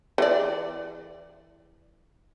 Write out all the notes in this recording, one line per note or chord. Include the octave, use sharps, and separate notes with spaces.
E3 D5